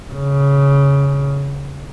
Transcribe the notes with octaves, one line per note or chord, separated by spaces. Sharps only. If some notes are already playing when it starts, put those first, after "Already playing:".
C#3